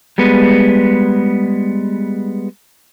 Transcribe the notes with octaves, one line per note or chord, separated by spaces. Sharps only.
G3 G#3 B3